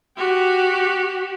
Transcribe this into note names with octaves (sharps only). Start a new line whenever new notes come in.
F#4 G4